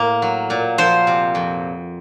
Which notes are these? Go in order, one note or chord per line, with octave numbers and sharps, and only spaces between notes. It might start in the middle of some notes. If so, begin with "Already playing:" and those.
Already playing: A2 A#3
F#3
A#2
F3 C5
C3
F2